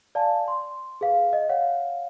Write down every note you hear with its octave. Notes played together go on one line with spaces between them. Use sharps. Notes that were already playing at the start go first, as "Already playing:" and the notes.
D5 F5 G#5 A5
C6
G#4 B4 F5
D#5
C#5 F5 F#5